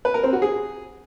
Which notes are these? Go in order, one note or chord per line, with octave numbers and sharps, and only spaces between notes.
B4
A#4
C4
F#4
G#4